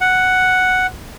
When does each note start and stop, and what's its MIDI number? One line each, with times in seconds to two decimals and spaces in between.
0.01 0.87 78